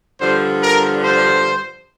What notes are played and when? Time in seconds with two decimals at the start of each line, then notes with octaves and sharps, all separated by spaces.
0.20 G2 D3 F3 C5
0.62 A#4
1.04 C5